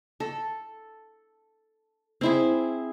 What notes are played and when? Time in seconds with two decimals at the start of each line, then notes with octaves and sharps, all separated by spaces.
0.20 A4
2.21 C4 E4 G#4